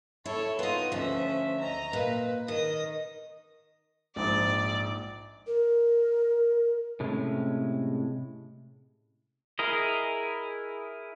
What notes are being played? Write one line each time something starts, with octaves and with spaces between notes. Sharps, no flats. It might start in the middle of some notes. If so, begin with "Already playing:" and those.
E4 A4 C#5
B3 D#4 F4 D#6
D2 F3 C#4 E5
D#5 A#5
A#2 B4
D#3 D#5 D#6
A#1 G#2 D5
A#4
A2 C3 G#3 C#4
E4 G#4 A#4 D#5